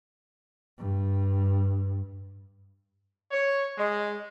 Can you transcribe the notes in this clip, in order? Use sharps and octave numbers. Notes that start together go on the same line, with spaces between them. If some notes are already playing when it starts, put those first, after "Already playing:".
G2
C#5
G#3